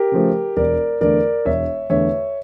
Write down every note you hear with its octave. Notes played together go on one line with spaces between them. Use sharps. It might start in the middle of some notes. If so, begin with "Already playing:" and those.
Already playing: G4 A#4
C#3 F3 A3
E1 A#4 D5
E2 D3 A3 A#4 D5
E1 C#5 E5
E2 D3 A3 C#5 E5